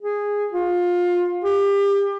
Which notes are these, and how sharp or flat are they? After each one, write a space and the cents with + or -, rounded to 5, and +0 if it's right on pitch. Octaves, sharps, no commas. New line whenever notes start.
G#4 -10
F4 +20
G4 +30